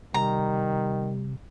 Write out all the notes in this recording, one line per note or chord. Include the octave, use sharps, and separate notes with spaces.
C3 D#3 G3 A#5